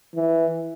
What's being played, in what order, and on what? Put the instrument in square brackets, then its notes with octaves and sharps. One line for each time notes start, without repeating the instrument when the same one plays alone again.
[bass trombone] E3